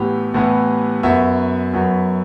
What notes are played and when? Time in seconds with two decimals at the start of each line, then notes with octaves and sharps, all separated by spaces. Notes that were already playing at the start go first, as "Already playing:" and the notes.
Already playing: A2 E3 B3 G4
0.34 A2 E3 B3
1.03 F#2 F#3 B3 E5
1.73 F#2 F#3 B3